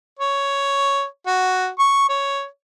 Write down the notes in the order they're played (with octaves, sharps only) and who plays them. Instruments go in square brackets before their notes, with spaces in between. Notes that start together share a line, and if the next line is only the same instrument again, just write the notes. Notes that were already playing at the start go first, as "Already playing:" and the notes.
[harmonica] C#5
F#4
C#6
C#5